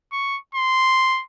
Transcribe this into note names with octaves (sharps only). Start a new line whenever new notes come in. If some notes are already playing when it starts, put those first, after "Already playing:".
C#6
C6